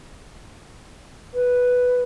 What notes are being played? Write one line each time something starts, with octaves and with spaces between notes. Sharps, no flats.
B4